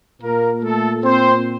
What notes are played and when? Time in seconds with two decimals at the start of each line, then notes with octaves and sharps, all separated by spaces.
0.22 A#2 A#3 A#4
0.63 A3 A4
1.04 C4 C5